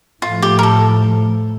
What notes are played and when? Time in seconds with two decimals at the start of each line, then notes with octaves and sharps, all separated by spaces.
0.22 A2 F3 A3 F4
0.42 G4
0.59 A#4
0.63 A4